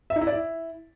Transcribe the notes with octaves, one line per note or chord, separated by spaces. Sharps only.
E5
D#4
E4
D5
E4